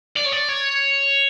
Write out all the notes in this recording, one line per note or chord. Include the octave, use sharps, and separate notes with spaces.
D5
C#5
D5
C#5